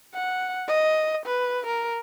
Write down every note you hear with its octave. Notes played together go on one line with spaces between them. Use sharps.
F#5
D#5
B4
A#4